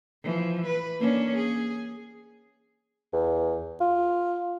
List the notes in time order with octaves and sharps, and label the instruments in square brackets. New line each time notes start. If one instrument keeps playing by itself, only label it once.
[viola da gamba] E3 F3
B4
A#3 C#4 D4
G#4
[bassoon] E2
F4